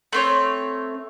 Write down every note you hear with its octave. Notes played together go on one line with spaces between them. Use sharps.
A3 C4 C#5